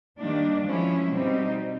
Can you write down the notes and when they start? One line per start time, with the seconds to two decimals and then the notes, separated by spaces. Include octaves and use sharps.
0.18 D#3 G3 A#3 D4
0.64 F3 G#3 C#4 E4
1.10 B2 G3 C4 D#4